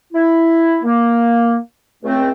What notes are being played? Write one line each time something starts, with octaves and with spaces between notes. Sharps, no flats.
E4
A#3
C#2 A3 C4